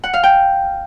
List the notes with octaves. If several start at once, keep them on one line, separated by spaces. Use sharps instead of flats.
F#5
F5
G5